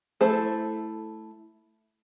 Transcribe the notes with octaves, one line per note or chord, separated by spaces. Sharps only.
A3 E4 A4 C5